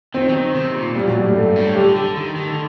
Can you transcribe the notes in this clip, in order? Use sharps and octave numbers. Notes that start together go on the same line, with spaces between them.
D#3 C4
F#3
D#3
C3
A#2
A#2 G3
F#3
A2
G3
G2 A3
A2
D#3
D3 G4
D3
D#3
D#3
D3